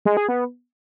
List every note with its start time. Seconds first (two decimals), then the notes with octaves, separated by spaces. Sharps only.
0.05 G#3
0.17 G#4
0.29 B3